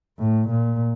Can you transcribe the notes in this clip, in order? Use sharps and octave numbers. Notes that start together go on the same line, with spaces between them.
A2
A#2